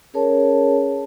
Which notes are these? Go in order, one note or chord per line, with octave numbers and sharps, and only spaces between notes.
C#4 G#4 A#4 C#5 A5